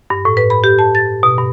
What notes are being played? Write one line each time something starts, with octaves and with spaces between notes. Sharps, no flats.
G2
A2
B4
B5
G4
A5
A6
B2
G2